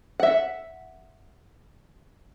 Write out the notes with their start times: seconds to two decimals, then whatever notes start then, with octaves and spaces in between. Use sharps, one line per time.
0.20 E5 F#5